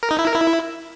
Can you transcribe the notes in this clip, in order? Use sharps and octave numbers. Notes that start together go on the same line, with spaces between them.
A#4
D#4
E4
A#4
E4